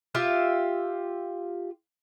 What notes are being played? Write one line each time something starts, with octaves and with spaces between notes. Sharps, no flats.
F4 G4 E5 F5